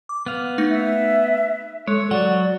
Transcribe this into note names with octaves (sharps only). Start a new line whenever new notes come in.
D6
B3 F5
A3 D#4 A#6
E5
G#3 A4 C#5
F#3 F#4 D5 F#5